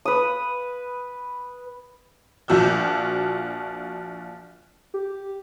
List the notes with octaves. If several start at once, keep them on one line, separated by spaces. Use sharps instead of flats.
B4 D#6
A#1 F3 F#4 E6 G6
G4